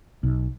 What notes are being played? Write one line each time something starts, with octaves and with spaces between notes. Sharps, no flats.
B1